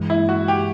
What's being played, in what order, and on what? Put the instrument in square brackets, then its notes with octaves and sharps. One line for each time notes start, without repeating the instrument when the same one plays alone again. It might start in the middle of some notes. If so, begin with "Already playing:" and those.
Already playing: [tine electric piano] G2 E3 G#3
[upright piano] E4
F#4
G4